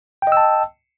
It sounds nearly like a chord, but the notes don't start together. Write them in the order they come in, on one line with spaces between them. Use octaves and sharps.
G5 D#5 E6 A5